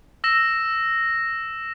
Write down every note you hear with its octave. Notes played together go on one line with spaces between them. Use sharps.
E6 A#6 E7